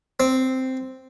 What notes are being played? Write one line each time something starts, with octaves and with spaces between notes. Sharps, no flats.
C4